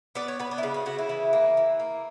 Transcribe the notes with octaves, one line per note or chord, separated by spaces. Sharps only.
B3 D5
C#5
B3 B4
D4
E4
C#3 D4
F#4
C#3 F#4
E4
E3
A#3
E3
A#3